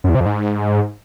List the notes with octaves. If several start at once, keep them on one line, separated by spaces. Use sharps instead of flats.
F#2
E2
C3
F2
G#2